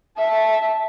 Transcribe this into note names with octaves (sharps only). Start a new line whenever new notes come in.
E5 A5